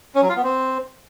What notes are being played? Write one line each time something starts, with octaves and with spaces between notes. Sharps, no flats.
C#4
F#3
F4
B3
C4